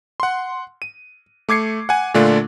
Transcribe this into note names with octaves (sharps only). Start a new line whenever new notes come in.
F#5 C6
D#7
A3 D6 G#6 C7 C#7
F#5 G#5
A#2 D3 A3 D4 F4